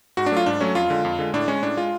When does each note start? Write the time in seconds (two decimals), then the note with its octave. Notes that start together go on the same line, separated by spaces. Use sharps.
0.17 G#2 F#4
0.26 D4
0.32 F#3 A3 F4
0.46 G#2 D4
0.61 F#3 A3 C#4
0.75 F2 F4
0.90 D3 G#3
1.05 F2
1.19 D3 G#3
1.34 A2 D4
1.48 G#3 C#4
1.62 A2 D4
1.77 G#3 F4